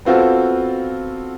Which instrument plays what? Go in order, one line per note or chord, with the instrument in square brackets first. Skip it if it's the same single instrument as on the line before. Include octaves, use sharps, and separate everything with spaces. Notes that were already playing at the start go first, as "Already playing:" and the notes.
[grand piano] B3 C4 F4 F#4 A4